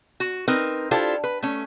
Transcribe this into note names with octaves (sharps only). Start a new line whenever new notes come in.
F#4
C4 D#4 A#4 B4
D4 E4 F4 G4 A4 C5
B4
A3 C#4